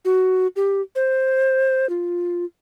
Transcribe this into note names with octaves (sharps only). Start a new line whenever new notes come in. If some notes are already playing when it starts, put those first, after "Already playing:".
F#4
G4
C5
F4